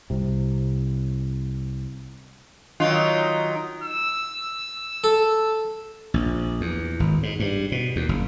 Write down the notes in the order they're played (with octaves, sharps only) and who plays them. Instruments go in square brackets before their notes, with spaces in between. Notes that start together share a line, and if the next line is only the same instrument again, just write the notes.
[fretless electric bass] C2 C3
[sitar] D#3 F#3 F4
[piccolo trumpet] E6
[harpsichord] A4
[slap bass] A#1
E2
G#1
G#2
G2
B2
D#2
F#1